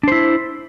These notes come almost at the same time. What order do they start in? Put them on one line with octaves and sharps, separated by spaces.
D4 C5 E4